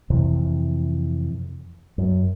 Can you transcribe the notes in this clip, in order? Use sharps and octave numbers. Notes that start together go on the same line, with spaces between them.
F2 C3 E3
F#2